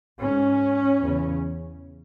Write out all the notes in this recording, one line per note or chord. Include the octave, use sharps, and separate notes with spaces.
G#2 C#4
E2 C#3